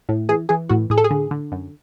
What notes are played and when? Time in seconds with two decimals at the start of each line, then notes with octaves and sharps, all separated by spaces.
0.09 A2
0.29 E3 G#4
0.49 E3 G#4
0.69 A2 F#4
0.90 A2 G#4
0.98 A4
1.04 G#4
1.10 D3
1.31 D3
1.52 F#2